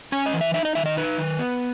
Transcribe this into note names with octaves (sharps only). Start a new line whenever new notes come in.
C#4 G#5
D#5
E3
E5
D#4 E5
D#5
D#3 E5
D#5
D#4 B4
D#3
B3